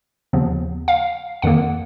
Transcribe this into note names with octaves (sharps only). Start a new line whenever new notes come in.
D#2 C#3 F3 B3
F5
F2 D#3 A#3 F#5